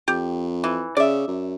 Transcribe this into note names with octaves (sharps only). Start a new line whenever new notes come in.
F2 G4
E3
C#3 D5 E5
F#2